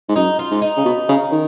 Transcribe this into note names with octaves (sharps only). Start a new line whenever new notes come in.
G#2
F#2 D#4
F4
G#2
D#4
C#3
B2
C#3
D#3